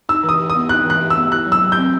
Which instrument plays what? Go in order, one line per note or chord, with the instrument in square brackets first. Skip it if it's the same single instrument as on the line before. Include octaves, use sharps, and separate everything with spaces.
[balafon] D#4 [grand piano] E6
[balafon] E3
[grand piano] D#6
[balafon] G4
[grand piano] D#6
[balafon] B3
[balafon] D#4 [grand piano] F#6
[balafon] E3 [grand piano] F#6
[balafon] G4
[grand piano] E6
[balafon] B3
[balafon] E4 [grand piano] F#6
[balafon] F#3
[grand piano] E6
[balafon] F#3
[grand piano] G6
[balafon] C4